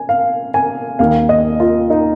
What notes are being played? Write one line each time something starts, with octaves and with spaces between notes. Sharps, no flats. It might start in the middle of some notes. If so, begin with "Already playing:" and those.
Already playing: G#5
F5
G#5
D#2 D#3 F5
D#5
F4
D#4